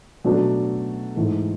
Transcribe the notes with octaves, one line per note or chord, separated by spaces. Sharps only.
B2 F#3 A3 D4
G#2 E3 A3